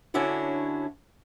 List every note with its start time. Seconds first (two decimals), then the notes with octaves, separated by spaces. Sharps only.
0.14 D3 C#4 D4 E4 F#4 C#5